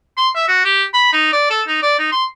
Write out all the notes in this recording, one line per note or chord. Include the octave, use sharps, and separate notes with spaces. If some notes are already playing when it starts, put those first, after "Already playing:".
C6
E5
F#4
G4
B5
D#4
D5
A4
D#4
D5
D#4
C6